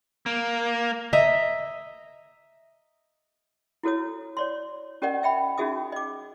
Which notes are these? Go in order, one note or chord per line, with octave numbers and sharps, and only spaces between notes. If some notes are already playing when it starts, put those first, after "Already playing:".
A#3
D#5 E5 A#5
E4 F#4 A4 C#5 D#6
C#5 D5 C6
C#4 G4 A#4 D5 D#5 F#5
E5 G5 B5
C#4 D#4 F#4 G#4 E5 D#6
D#5 D6